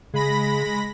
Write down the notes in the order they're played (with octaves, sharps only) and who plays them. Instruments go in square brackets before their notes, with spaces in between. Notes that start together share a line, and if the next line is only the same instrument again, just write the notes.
[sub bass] C#3 [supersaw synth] G#3 B5 A#6